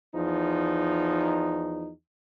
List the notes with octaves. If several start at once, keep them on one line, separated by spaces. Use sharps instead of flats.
E2 F3 D#4